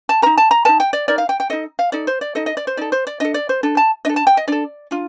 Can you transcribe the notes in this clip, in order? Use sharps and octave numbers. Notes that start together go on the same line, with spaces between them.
A5
D#4 A#4 A#5
A5
A#5
D#4 A#4 A5
G5
D5
D#4 A#4 D5
F5
G5
G5
D#4 A4 D#5
F5
D#4 A4 D5
C5
D5
D#4 A4 D#5
D#5
D5
C5
D#4 A4 D5
C5
D5
D4 A4 D#5
D5
C5
D4 A4
A5
D4 A4 D#5
A5
G5
D#5
D4 A4 D5
D4 F4